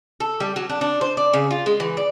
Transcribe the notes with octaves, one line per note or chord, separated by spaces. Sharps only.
A4
G3
F#3
D4
D4
C5
D5
C#3
F4
G#3
E3
D5